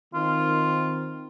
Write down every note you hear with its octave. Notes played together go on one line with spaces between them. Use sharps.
D#3 C4 F4